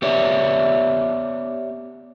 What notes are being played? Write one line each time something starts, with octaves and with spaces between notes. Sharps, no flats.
B3 G4 C#5 D5 E5